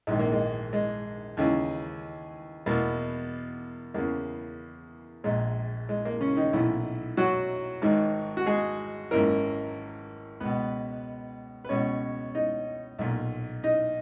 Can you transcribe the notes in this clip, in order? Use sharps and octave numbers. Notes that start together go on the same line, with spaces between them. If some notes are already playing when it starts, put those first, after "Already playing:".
A#1 G#2 D#3 G#3
A#3
G#3
G#3
D#2 C#3 E3
E2 B2 A#3
E2 C#3 E3 A#3
A#1 A#2 G#3
G#3
A#3
C#3 C#4
D#3 D#4
B1 A#2 E3 E4
F#3 F#4
G#1 G#2 D#3
F#4
G#3 G#4
G#1 F#2 E3 A#3 A#4
C#2 B2 B3 B4
B4
C#2 B2 C#4 C#5
D#4 D#5
B1 A#2
D#4 D#5